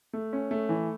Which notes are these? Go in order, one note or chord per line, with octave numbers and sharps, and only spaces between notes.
A3
C#4
A3
E3